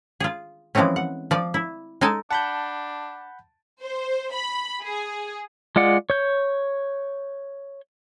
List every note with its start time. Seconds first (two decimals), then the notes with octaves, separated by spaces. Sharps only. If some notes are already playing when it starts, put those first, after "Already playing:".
0.20 F4 G#4
0.75 E3 F3 G#3 A3 C4 C#4
0.96 F#5
1.31 F3 D5
1.54 E4
2.01 G#3 D#4 A4 G#5 A5
2.31 D4 F#5 A5 B5 G6
3.82 C5
4.33 B5
4.83 G#4
5.76 G#3 F4 D5 F#5
6.10 C#5 G6